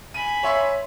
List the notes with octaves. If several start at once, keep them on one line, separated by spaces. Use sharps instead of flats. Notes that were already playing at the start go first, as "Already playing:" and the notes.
G#5 B5 D#7
C#5 E5 C6